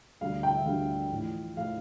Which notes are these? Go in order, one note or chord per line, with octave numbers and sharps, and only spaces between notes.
D2 D3 G3 F5
G5
E5
D2 D3 G3 F5
A1 A2 F3
A2 F3 F5